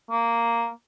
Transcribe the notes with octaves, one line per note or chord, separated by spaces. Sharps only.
A#3